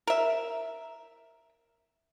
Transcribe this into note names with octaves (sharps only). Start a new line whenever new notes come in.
A#4 E5